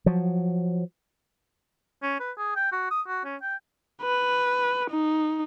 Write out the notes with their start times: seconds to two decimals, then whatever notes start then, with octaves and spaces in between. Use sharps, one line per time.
0.06 F3 F#3
2.03 C#4
2.20 B4
2.38 G#4
2.56 G5
2.72 F#4
2.91 D#6
3.07 F#4
3.25 C#4
3.42 G5
4.02 B4
4.91 D#4